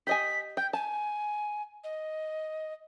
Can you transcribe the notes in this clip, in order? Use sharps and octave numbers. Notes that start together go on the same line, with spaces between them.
G4 D#5 G#5 B6
G5 G6
G#5 A5
D#5